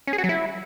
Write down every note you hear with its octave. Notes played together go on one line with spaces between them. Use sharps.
C#4
G#4
F#4
F#3
E4